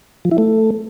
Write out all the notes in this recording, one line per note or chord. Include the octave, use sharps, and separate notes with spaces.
F3
E4
A3